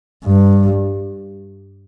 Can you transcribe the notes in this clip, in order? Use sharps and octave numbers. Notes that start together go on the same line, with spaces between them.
G2